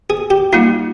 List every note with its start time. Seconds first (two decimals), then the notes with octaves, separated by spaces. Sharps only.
0.10 G#4
0.30 G4
0.53 G3 A#3 D#4 F4